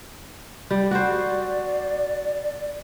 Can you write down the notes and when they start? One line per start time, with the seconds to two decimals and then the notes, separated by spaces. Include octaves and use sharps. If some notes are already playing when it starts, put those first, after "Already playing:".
0.71 G3
0.91 F#4 C5 D5